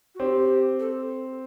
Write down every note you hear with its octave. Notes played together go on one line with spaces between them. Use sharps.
F#4
C4 G4
A4